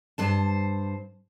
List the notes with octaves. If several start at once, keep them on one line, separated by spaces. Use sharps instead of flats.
G2 C5 A5